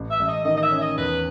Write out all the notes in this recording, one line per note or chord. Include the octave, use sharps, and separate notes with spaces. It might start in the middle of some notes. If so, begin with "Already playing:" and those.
Already playing: A1
E5
A1
D#5
D#3 D#5
D#5
E5
C#4
D#5
E2 B4